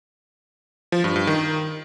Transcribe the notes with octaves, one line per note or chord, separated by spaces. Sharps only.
F3
G2
G2
D#3